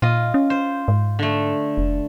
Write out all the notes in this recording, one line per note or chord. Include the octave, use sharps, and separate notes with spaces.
A#2 F4 D#5
C#4
C5
G#2
D3 A3
F1